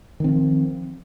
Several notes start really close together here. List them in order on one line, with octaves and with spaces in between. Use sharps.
D#3 C4 F3